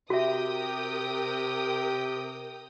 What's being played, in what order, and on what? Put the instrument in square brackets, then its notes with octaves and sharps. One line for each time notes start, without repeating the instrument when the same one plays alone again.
[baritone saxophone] C3 [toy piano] F#4 E5 [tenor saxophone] G4 [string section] A#4 G5 D#6